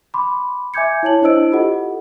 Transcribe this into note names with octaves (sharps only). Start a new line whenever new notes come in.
B5 C6 D6
E5 G#5 D6 G6 G#6 C#7
E4 C#5 A5 F#7
D4 E4 C5 D#5 E6 D7
F4 G4 A4 D#5 F#5